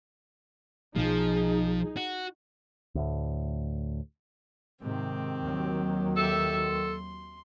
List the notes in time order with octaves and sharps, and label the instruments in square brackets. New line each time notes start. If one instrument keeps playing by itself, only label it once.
[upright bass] B1 [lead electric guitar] F3 [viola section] D#4 G#4
[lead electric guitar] F#4
[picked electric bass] D2 A2
[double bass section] G#2 C3 [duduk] D#3 [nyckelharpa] C4 G4
[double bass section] D#2 F#3
[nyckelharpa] G4 E5 [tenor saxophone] A4
[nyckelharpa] C6